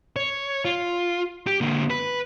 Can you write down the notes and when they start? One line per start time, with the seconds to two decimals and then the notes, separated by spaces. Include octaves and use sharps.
0.16 C#5
0.65 F4
1.47 G4
1.61 D3 A#3
1.90 B4